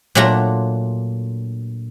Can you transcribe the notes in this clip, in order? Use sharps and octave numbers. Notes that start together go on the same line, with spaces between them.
A#2 F#3 A3 D4 F4 A#5